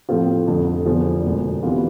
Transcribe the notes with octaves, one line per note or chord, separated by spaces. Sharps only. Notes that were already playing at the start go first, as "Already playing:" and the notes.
A2 F3 A3 C4 F4
F1 F2 D3
F1 E2 D3 F3
E1 D2 D3
C3 E3 B3 F4